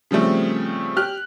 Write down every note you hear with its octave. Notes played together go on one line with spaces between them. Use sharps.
C#3 F3 G3 A3 C4
G4 F6 F#6